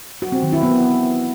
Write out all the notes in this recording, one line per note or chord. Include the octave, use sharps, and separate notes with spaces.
F#4
C4
D#3
E4
B3